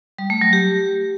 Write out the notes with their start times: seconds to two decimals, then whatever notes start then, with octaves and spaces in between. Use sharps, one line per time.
0.19 G3
0.30 A3
0.41 F#3
0.53 G4